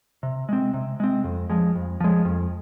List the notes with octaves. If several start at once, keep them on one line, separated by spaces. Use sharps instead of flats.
C3
G#3 C4
C3
G#3 C4
F2
F3 G#3
F2
F3 G#3
F2